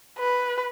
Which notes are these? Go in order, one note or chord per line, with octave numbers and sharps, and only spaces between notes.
B4